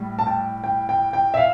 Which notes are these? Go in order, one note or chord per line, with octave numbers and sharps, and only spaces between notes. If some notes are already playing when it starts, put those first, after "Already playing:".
Already playing: A2 G3
A5
G5
G5
G5
G5
E5
F5